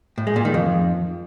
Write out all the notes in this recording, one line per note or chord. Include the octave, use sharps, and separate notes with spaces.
A2
G#3
A#2
D#3
F2